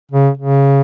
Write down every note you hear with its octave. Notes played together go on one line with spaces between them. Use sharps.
C#3
C#3